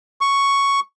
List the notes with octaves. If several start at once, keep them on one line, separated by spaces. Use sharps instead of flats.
C#6